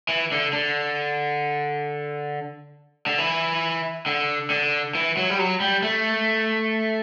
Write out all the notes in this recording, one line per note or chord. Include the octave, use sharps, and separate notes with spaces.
E3
D3
D3
D3
E3
D3
D3
E3
F#3
G3
F#3
G3
A3